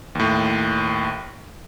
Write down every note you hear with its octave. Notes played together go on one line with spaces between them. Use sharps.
D#2 A2